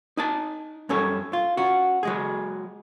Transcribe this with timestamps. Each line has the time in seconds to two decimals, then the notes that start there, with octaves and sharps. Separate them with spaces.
0.17 D#4 G#5 A5
0.89 F#2 G3 C#4 A4 C#5
1.33 F4
1.57 C#4 F#4
2.03 F#3 G#3 G#4